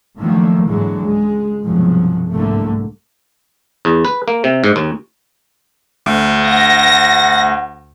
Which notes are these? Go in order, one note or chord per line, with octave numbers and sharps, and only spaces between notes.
D3 D#3 F3 F#3 A3 A#3
G#2 D3 E3 F#3 G#3
C#2 G#3
C2 G2 B2 F3 F#3 G#3
C2 G#2 D3 G3 A3 A#3
E2
B4
A#3
C3
G#2
D#2
D2
F#5 A#6